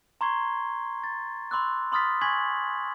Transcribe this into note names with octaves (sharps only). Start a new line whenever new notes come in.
A#5 C6 C#6 G#6 C7 G7
A6
B5 C6 D6 E6 F#6
B5 C6 D#6 F6 A6 B6
G#5 C#6 F#6 G#6 B6 F#7